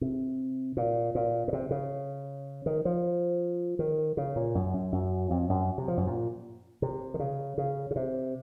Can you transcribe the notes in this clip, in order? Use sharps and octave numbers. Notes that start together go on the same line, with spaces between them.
C3
A#2
A#2
A#2
C3
C#3
D#3
F3
D#3
C#3
A#2
F#2
F#2
F#2
F2
F#2
C3
F3
F#2
A#2
C3
D#3
C#3
C#3
C#3
C3